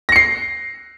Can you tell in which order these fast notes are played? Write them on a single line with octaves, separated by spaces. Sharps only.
A#6 C#7 C7